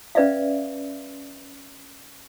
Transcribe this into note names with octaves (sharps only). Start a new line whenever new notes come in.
C#4 B4 D5 E5 F5